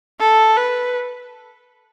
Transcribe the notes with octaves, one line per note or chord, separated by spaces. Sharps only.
A4
B4